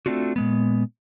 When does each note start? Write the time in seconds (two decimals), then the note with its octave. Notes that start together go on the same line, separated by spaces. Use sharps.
0.06 A3 C4 D4 F4 F#4
0.36 A#2 G#3 B3